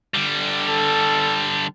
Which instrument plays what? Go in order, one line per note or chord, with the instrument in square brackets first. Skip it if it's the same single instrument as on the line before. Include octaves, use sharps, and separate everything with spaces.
[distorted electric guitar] D3 G3
[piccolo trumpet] A4